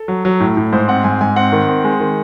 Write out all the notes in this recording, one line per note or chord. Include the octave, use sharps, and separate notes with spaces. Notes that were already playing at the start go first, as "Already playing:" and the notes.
Already playing: A4
F#3
F#3
A2
A2
G#2 C5
C4 F#5
G#2 G#5
G#2 G#5
C4 F#5
D#3
C4
G#3
D#3